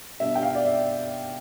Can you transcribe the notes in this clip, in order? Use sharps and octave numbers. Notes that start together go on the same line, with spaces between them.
B2 G3 D4 E5
G5
F5
D5
E5